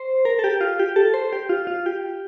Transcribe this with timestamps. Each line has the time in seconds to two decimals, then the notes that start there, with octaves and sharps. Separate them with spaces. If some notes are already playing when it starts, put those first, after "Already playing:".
Already playing: C5
0.25 A#4
0.39 A4
0.44 G4
0.61 F4
0.79 G4
0.96 A4
1.14 C5
1.33 G4
1.49 F4
1.67 F4
1.86 G4